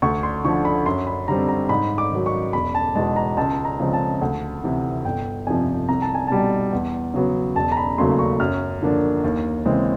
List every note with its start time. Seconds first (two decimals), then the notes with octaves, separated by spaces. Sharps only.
0.02 D2 C#6
0.23 C6
0.44 D3 F3 C#6
0.65 B5
0.86 F#2 C6
1.07 B5
1.28 D3 G3 C4 A#5
1.49 A#5
1.69 G#2 B5
1.98 D6
2.12 D#3 F#3
2.26 C#6
2.53 E1 B5
2.75 A5
2.95 E2 B2 G#3 A5
3.16 A#5
3.37 C#2 A5
3.65 A#5
3.79 C#3 F3 G#3 C4
3.93 A5
4.21 D2
4.63 C3 E3
5.05 G1 G5
5.46 F2 C3 F3 G#5
5.89 C2 A#5
6.02 A5
6.15 G#5
6.27 B2 G3 A5
6.72 E2
7.14 C#3 F#3 B3
7.56 E1 A5
7.72 A#5
7.77 B5
7.98 D#2 C#3 F#3 A3 C6
8.19 C#6
8.40 F#2 F6
8.82 D3 F3 A#3 D4
9.24 D#2
9.65 C#3 E3 G#3 C4